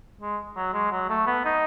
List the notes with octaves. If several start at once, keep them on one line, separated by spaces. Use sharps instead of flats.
G#3
F#3
G#3
F#3
A3
B3
D#4